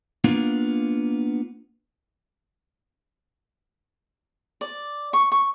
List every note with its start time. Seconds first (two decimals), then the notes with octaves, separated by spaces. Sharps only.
0.24 A#3 B3 D4 F4
4.61 D5
5.13 C#6
5.32 C#6